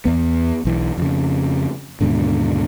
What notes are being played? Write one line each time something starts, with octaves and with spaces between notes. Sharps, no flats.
E2 B3
B1 E3
F2 C#3
D#2 G#2 B2 D3